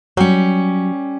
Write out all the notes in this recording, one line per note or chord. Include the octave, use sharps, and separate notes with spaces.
F#3 G3 C#4